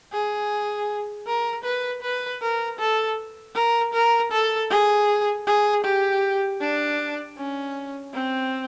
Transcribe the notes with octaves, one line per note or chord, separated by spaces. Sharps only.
G#4
A#4
B4
B4
A#4
A4
A#4
A#4
A4
G#4
G#4
G4
D4
C#4
C4